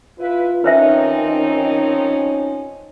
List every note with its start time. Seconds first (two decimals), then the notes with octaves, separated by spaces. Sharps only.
0.20 E4 F4 B4
0.64 D#3 F3 C4 C#4 D#4 B4 C5 E5
1.28 C#4